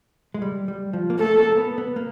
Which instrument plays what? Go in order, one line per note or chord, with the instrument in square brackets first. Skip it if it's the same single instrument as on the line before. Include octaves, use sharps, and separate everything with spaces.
[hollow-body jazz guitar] G#3
G3
G3
F3
A#3
[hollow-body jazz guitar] A3 [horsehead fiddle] A4
[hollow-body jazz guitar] A#3
A#3
B3
B3
A#3